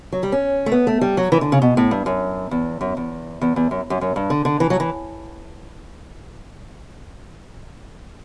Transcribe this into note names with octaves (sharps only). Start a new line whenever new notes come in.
F#3
G3
C#4
A3
B3
A3
G3
F#3
E3
D3
C#3
B2
A2
G2
F#2
E2
F#2
E2
E2
E2
F#2
F#2
F#2
G2
D3
D3
E3
F#3
E3